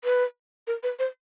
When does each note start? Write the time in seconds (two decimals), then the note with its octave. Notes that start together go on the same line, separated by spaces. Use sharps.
0.04 B4
0.67 A#4
0.83 B4
0.99 C5